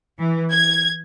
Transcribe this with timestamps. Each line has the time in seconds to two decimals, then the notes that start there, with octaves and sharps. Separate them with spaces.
0.18 E3
0.52 G#6